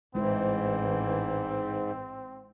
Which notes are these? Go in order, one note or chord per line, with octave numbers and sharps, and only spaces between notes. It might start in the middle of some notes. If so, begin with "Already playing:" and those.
A1 G#2 E3 G#3 C4 E4 C5